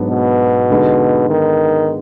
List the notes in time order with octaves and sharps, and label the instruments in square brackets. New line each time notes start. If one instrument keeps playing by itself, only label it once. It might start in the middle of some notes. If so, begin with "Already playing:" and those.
Already playing: [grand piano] G#2 F#3 B3 D4 F#4
[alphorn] B2
[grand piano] D3 G#3 B3 D#4
[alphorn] D#3